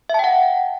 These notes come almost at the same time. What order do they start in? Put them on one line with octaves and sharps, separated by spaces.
E5 A5 G5 F#5